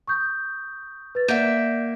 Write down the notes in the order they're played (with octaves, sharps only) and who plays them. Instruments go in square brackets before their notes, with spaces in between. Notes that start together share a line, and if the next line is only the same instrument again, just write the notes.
[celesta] C#6 D#6 G6
B4 A6
[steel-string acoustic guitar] A#3 E5 [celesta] D5 F#5 G6